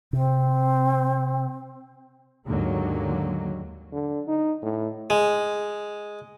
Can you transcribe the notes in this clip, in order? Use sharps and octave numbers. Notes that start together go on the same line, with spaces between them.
C3 C4
D#2 G#2 D3 F#3 A#3
D3
D#4
A2
G#3